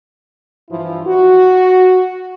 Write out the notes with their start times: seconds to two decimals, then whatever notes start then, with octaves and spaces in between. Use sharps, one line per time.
0.70 G2 E3 F3 E4
1.07 F#4